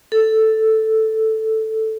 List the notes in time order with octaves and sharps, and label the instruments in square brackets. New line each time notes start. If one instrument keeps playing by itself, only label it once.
[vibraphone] A4